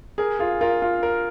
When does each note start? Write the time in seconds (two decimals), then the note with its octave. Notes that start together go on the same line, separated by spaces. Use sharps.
0.18 G#4 A#4
0.39 F4 G#4
0.61 F4 A#4
0.82 F4
1.03 A#4